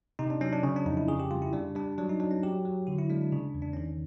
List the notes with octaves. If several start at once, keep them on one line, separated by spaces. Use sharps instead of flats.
C3 D#4
D4
F#3 C#4
D4
C#3 C#4
D4
F2 D#4
E4
C#3 G#4
G4
G3 F4
E4
G3 D4
G3 D4
F#3 D4
D#4
F#3 D4
C#4
F#3 G4
F#3
D3 F#4
E4
G#3 D4
D4
C#3 D4
E2
D4
D#3 C#4